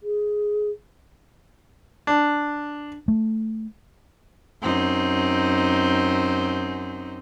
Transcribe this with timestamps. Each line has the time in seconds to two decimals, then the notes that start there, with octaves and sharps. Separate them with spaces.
0.03 G#4
2.07 D4
3.08 A3
4.62 F#2 C4 D#4